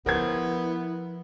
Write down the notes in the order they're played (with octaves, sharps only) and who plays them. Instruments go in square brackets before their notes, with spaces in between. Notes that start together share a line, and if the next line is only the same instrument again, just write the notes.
[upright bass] F3 [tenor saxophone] B3 [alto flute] E4 [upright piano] A#4 C5 G#6